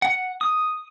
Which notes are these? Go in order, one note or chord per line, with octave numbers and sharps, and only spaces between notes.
F#5
D#6